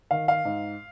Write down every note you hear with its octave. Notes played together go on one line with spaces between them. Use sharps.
D#3 F5
F5
G#2